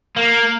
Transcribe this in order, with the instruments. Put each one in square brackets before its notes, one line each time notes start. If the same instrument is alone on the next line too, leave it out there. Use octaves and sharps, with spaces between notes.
[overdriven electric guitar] A#3